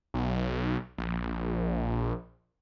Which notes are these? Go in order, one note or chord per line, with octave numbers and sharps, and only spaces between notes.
B1
A#1